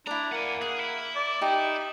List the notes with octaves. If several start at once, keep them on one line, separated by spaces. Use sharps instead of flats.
D4 E4 D5 A#5
A#3 F#5 G#5
G#4 F#5
E4
D5
D#4 G4